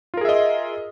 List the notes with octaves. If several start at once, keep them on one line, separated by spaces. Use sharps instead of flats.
F4 G#4 A#4 D#5 E5